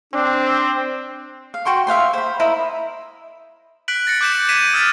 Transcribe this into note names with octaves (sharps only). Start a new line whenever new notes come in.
C4 D4
F5
F#4 G5 C6 C#6
E5 F5 G5 C6
C5 B5
E4 A#4 D#5 B5
F#6 B6 D7 F#7
A6 A#6 C#7
D6 F#6 G6 B6 D7 E7
G#6 B6 D#7 E7
D#6 F6 A6 D#7